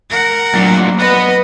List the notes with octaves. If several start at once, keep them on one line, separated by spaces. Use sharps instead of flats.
A#4 F#5
D2 A#2 F#3
B3 B4 D#5 F#5